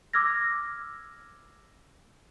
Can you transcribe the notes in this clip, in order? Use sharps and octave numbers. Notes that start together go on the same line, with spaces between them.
D6 E6 F6 G#6 A#6